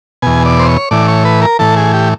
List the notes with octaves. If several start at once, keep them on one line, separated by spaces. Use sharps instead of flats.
E2 B2 G#5
D5
C5
C#5
A2 E3 D5
C#5
B4
A#4
A2 E3 A4
G#4
G4